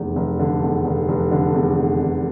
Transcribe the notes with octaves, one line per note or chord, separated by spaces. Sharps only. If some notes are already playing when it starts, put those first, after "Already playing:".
Already playing: F1 E2
F1
D3
E2
F1
F1
D3
E2
F1
F1